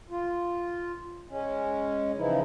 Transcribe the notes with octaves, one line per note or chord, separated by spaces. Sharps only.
F4
G#3 C#4
C#3 E3 F3 D#4 E4